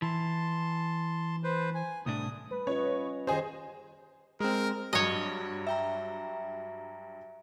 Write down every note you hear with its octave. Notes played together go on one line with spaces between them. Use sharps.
E3 A5 C6
B4 C5
G#5
C2 A2 D4 D#6
G3 B4
C#4 F4 C#5 D#5
D#3 G4 G#4 C5 D#5
G#3 C4 A#4
G2 F#3 C#5 D#5
E5 G5 A#5